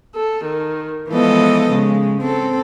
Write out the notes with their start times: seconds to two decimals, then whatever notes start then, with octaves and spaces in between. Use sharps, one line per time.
0.15 A4
0.45 D#3
1.09 E3 F3 G#3 B3 A4 D#5
1.68 C#3 G#3
2.20 C4 A4